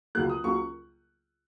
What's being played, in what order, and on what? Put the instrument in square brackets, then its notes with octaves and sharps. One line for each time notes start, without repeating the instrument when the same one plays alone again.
[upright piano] C#2 C#3 F#3 A#3 F#6
D#6
C#2 C#3 F#3 A#3 C#6